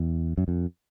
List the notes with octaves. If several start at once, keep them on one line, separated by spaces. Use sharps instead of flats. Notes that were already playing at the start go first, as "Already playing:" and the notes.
Already playing: E2
F#2
F2